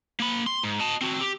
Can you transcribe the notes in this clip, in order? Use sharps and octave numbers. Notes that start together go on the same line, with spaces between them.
A#3 B5
C6
G#2
D#5 A5
C4 F#4
G4